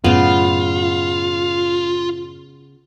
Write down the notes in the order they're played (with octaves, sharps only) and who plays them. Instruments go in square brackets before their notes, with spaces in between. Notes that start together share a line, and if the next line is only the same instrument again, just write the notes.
[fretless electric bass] F#2 A2 [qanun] C#3 B3 [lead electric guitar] F4